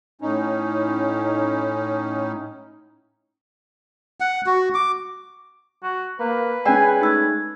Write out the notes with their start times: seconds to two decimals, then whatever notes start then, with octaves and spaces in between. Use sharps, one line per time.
0.21 A2 C#4 D#4
4.20 F#5
4.46 F#4
4.74 D6
5.83 F#4
6.20 A#3 B4
6.66 G#3 C#4 D5 G5 G#5 E6
7.01 A3 D#4 E6 G#6